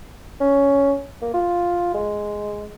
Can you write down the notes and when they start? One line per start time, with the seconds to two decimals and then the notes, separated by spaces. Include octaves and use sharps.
0.41 C#4
1.21 A#3
1.34 F4
1.94 G#3